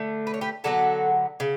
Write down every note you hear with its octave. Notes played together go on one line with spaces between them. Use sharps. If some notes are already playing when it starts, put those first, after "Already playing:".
Already playing: D3 A3
B4
C#5
G4 B4
D3 F#3 B3 F#4 A4
C#3